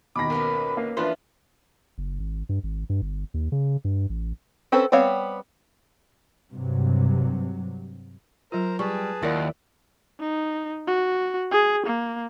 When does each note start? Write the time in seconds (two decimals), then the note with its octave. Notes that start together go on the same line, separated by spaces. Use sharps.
0.16 D#2 B2 B5 D6 A#6
0.30 B1 B3 C#4 A#4
0.77 A#3
0.97 E3 F3 B3 D4 F4 B4 C6
1.98 F#1
2.20 G#1
2.49 G2
2.64 G#1
2.90 G2
3.02 G1
3.34 D#2
3.52 C#3
3.85 G2
4.10 A1
4.72 C4 C#4 A4 B4 C5
4.92 G3 B3 C4 C#5 F5
6.51 G2 C3 F#3
8.52 F#3 F4 A#4 C5 A#5
8.79 G3 G#4 B4 A5 C#6
9.22 D#2 E4 F4 A#4 D5 F#5
10.20 D#4
10.87 F#4
11.52 G#4
11.87 A#3